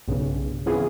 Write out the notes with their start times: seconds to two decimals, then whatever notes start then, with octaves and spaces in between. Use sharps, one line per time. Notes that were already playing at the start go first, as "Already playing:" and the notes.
0.08 B1 G2 C#3
0.66 C#3 E3 B3 C4 F4 G#4